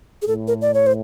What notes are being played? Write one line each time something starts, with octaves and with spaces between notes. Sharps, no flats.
G#4
A2 A4
A#4
D5
C#5
C5